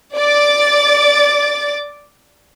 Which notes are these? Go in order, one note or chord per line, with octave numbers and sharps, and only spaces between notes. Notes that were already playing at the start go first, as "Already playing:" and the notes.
D5 D6 A6